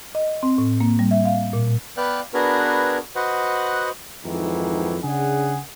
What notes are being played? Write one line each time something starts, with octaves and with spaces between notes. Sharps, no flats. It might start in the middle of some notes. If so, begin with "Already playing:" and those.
D#5
C4
A2
A#3
G3
E5
F5
A#2
B3 B4 D5 F5 G5 F#6
B3 D4 F#4 G#4 A#4 B4
F#4 B4 C5 D#5 F#5
F2 G#2 D#3 E3
C#3 D4 G#4 F#5